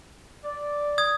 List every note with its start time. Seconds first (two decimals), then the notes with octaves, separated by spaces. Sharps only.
0.44 D5
0.98 D#6 G#6